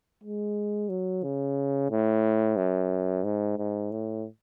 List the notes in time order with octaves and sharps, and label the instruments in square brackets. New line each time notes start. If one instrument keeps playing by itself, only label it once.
[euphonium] G#3
F#3
C#3
A2
F#2
G#2
G#2
A2